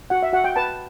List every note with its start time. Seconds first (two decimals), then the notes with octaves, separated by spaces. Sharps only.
0.10 F#4 F#5
0.23 E5
0.33 F#4 F#5
0.44 G5
0.56 B4 A5